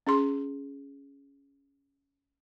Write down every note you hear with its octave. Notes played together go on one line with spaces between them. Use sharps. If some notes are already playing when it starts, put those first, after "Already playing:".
C#4 G#4 C6